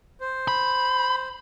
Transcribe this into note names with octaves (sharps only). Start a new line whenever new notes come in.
C5
B5